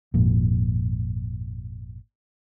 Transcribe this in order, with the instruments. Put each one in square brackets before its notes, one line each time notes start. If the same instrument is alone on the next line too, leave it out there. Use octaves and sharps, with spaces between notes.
[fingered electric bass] G#1 F2 A#2